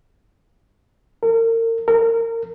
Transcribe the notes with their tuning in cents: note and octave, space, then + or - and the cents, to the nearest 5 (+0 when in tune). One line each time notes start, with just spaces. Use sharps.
A#4 -35
A#4 -25